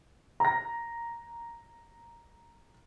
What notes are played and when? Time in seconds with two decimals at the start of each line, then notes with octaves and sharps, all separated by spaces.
0.40 A#5 A#6